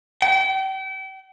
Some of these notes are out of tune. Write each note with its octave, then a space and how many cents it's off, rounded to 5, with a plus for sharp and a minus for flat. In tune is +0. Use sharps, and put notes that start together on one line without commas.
G5 -35